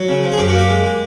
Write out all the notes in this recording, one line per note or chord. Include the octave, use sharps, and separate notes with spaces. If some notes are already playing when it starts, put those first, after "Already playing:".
Already playing: F#3 F#4
C#3
F3
G#4
F#2 G4
F#4
A#3
G4
G#3
G#3